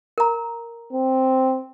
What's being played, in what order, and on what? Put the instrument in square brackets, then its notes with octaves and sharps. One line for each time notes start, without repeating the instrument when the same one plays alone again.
[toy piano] A#4 A#5
[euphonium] C4